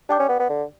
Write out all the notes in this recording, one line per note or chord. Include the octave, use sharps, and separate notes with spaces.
D4 G4 D5 G5 D6 G6
C#4
B3
B3
D3